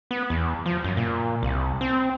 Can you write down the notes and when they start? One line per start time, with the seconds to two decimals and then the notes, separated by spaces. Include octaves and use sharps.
0.11 B3
0.30 E2
0.66 F3
0.84 F#2
0.97 A#2
1.43 C2
1.81 C4